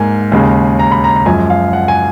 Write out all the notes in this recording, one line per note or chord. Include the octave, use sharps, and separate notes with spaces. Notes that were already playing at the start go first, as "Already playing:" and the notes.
Already playing: G#2 A#3 G#5
D#2 C#3 G#3
A#5
B5
A#5
A#5
F#2 F3 G#3 G#5
F5
F#5
G#5